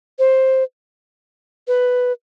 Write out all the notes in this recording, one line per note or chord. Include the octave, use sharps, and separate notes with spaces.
C5
B4